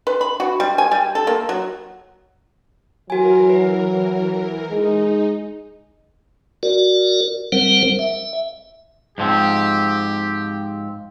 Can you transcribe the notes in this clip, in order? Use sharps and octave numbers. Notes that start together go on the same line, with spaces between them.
B4
B5
F#4
G3
G#5
G3
A4
A#3
F#3
E3 F#3 F#4 A#4 G#5
B4
G#3 D#4
F#4 A#4 D5
G3 C4 A#4 C5 F#5
E5
G#2 F3 C4 G4